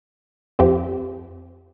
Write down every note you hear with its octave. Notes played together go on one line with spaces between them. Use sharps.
F2 F3 C4 G4